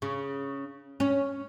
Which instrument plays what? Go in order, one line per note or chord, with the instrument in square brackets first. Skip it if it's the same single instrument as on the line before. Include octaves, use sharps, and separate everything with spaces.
[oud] C#3
C#4